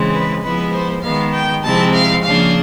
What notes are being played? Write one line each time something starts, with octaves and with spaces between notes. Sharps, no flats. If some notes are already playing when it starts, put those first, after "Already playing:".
Already playing: C#3 E3 G#3 C4
B4
F3 G#3 B3 E4 B4
C5
D#3 G#3 B3 F5
G5
C3 F3 G#3 C4 E4 A5
F5
C#3 F3 A#3 D4 F5